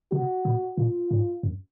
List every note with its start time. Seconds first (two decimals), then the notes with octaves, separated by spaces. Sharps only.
0.12 C3 F#4
0.45 A#2
0.78 A#2 F4
1.11 G#2
1.43 F#2